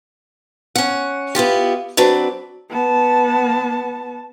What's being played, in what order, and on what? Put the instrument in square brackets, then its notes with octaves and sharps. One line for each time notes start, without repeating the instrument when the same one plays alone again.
[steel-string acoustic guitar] C#4 F#5
B3 E4 F4 G4
F#3 C4 D4 B4
[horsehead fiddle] B3 A5